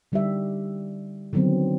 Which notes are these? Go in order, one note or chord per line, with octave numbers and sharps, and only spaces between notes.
D3 G3 D#4 G4 E5
D3 D#3 F#3 B3 C4